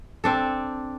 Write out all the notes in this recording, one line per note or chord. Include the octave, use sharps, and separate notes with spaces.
C4 D4 A4